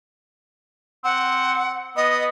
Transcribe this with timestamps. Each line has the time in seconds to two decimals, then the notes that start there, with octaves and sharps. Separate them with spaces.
1.04 C4 F#5
1.96 B3 D#5